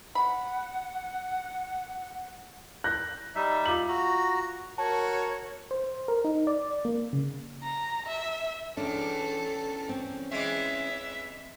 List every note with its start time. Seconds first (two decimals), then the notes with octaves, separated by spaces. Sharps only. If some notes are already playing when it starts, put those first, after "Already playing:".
0.15 F#5 B5
2.84 F#6 G6 A#6
3.35 G3 D#4 E5
3.66 F4 D6 F#7
3.89 F#4 A#5
4.78 F#4 A#4 C#5 A5
5.71 C5
6.08 A#4
6.24 D#4
6.47 D5
6.85 A#3
7.13 C#3
7.63 A#5
8.07 E5
8.77 E2 C#4 D4 A4
9.89 C4
10.32 E3 G#3 E5